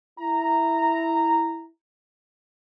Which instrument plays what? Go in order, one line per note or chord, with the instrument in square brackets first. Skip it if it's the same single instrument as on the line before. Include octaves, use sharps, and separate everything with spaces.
[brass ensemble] E4 A#5